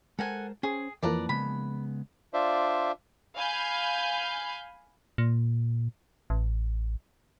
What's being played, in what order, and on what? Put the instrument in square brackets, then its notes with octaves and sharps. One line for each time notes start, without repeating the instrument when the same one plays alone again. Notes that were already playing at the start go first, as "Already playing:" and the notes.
[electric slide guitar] G#3 A#4 C5 [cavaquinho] A4 F#5 G#5
[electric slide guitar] C#4 C5 [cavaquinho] G#4
[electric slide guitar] F2 B4 [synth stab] E3 F3 A#3 [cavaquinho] D5 A5 A#5
[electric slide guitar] C#3 G#3 B3 [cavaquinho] B5
[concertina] D4 F4 C5 D5 E5
[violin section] F5 G#5 B5 G6
[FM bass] A#2
A1